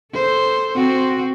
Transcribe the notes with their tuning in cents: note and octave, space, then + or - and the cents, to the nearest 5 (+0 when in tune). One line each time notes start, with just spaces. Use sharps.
A4 +0 C5 +0
C4 +0 F#4 +0 C5 +0